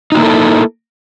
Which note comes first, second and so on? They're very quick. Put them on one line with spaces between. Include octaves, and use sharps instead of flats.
D#4 F#4 A#3 E4 A4